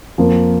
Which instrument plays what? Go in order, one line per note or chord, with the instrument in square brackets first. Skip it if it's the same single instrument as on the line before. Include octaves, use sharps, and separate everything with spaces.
[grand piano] F2 F3 A#3